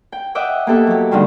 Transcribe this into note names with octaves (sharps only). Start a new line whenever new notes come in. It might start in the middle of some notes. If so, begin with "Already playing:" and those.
G5
D#5 E5 F#5 G5 D6
A#3 B3 G4 A4 E5 F#5
F#3 G4
G#2 D3 D#3 G3